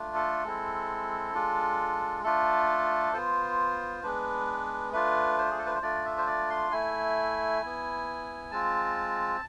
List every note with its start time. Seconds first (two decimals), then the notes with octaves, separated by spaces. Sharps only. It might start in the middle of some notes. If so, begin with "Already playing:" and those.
Already playing: A3 D4 F4
0.15 A4
0.44 G#3 C4 E4
1.34 G#3 D4 F4
2.24 A3 D4 F4 A4
3.13 B3 F4 C5
4.03 G#3 B3 D4 B4
4.93 A3 D4 F4 B4
5.38 C5
5.51 G#4
5.58 A4
5.66 B4
5.75 C5
5.82 A3 D4 F4 D5
6.04 E5
6.18 C5
6.27 D5
6.50 C6
6.71 A3 E4 G#5
7.62 B3 E4
8.51 G#3 C4 F4 A5